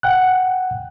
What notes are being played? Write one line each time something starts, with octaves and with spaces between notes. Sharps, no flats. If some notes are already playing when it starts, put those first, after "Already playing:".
F#5 G5 F#6